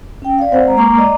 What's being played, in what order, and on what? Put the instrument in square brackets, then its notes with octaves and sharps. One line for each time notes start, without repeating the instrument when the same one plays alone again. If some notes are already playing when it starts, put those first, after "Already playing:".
[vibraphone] C#4 G5
D5 F5
C4 C5 F#5
G#3 A#5
G#3 A#3 A#5 C#6 D6
D5 D#5 A#5 D6